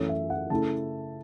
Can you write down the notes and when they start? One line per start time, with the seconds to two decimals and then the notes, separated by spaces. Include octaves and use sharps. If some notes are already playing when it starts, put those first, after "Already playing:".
Already playing: F#2 E3 A3 C#4 C#5
0.09 E5
0.30 F#5
0.50 C#3 A3 E4 A5